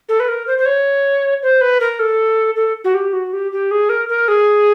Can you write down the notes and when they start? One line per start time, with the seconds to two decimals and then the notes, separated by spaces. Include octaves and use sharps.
0.09 A4
0.20 B4
0.28 A#4
0.47 C5
0.58 C5
0.65 C#5
1.42 C5
1.61 B4
1.80 A#4
1.99 A4
2.56 A4
2.84 F#4
2.94 G4
3.13 F#4
3.33 G4
3.52 G4
3.71 G#4
3.89 A#4
4.09 A#4
4.28 G#4